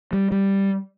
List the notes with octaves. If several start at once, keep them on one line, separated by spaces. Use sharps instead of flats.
G3
G3